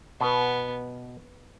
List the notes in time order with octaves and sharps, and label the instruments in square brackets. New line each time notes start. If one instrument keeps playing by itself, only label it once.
[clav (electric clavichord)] B2 [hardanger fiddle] B3